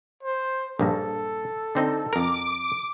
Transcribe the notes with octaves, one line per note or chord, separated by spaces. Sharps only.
C5
A#1 G2 A#3 A4
D3 C4 D#4
F2 A#4 D6